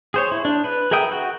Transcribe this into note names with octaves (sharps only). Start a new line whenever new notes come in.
G#4 C5 C#5
E4
D4
B4
G#4 A#4 E5 G5 D#6
F#4